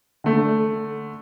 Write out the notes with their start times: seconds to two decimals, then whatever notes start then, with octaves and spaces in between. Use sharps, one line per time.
0.24 D3 A3